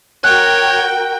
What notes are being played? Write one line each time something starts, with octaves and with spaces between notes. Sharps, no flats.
F#4 A#4 C#5 G5 F#6